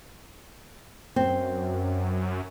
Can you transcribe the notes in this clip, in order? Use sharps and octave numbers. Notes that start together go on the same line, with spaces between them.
F#2 C4